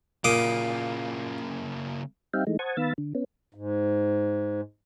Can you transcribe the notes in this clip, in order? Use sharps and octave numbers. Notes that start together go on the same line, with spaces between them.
A#2 C#3 A#3 D6 D#6
G3 C4 D#4 E5 F5 G5
E3 G#3 A3 D#4
C5 F#5 A5 C#6 D#6 G#6
D#3 B3 F5 B5 E6 A6
D3
B3 C#4
G#2